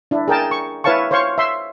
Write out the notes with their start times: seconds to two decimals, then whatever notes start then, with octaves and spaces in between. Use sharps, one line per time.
0.11 D4 E4
0.28 G#4 A#4 G5 A5
0.51 C#6
0.84 E4 B4 C#5 F5 A5 C#6
1.11 C5 C#5 F5 C6 C#6
1.38 E5 C6